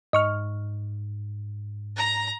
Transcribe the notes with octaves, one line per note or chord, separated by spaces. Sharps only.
G#2 D#5 C#6 F6
A#5